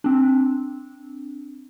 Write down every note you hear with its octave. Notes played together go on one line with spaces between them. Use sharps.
C4 D4